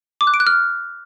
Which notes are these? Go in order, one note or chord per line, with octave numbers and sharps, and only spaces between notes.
D6
F#6
D7
F#6
F6